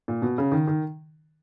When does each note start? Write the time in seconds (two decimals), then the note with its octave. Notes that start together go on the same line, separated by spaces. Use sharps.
0.08 A#2
0.22 B2
0.38 C#3
0.52 D#3
0.67 D#3